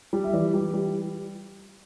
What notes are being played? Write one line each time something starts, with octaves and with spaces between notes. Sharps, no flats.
G3
E5
E3 D5
G3
G3